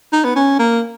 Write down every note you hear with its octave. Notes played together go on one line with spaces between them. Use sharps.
D#4
B3
C#4
A#3